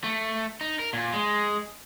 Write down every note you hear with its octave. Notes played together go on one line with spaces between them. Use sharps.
A3
D#4
A#4
A#2
G#3